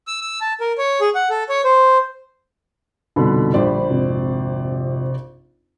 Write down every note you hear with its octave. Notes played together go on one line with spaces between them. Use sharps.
E6
E6
A5
A#4
C#5
G#4
F#5
A4
C#5
C5
C2 F2 B2 D3 D#4 B5
A#1 A#2 D3 G3 C5 D5
G#1 F2 C3